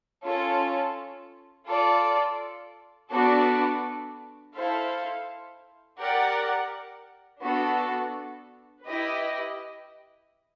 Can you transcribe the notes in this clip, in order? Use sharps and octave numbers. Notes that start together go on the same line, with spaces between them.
C#4 F4 A4
F4 A4 D5
B3 D4 F#4 A4 D5
E4 A4 C5 F5
G4 A#4 D5 F#5
B3 D4 F#4 A4
E4 G4 B4 D#5